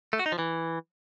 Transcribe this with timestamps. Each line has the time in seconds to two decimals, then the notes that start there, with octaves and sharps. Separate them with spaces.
0.13 A3
0.19 F#4
0.26 D#4
0.32 F3
0.39 E3